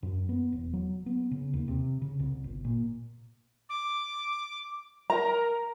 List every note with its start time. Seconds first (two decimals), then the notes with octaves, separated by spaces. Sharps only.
0.03 F#2
0.29 B3
0.52 E1
0.73 F#3
1.06 B3
1.31 C#3
1.53 D#2
1.68 C3
2.02 C#3
2.19 C2
2.44 G1
2.64 A#2
3.69 D6
5.10 A#4 A#5